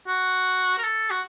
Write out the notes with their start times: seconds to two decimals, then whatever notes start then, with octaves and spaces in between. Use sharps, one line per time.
0.08 F#4
0.79 A#4
0.84 A4
1.10 F#4